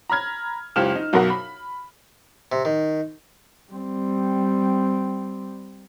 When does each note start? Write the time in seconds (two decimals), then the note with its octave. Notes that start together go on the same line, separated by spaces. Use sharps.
0.10 A#5 B5 F6 G#6
0.76 F#1 C#2 G4 F6 E7
0.95 D#4
1.13 B1 F#2 B2 A#4 F#5
1.30 B5
2.52 C3
2.65 D#3
3.72 G3 C4